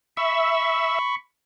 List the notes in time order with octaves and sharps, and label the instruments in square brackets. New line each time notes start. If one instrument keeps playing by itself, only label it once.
[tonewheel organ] E5 [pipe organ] B5 C#6